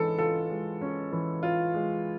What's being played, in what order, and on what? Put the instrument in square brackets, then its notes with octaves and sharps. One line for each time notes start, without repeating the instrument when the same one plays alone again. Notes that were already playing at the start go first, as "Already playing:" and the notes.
Already playing: [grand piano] E3 G#3 C#4 [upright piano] A4
[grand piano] F4 [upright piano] A4
[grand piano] G#3
C#4
E3
F4
G#3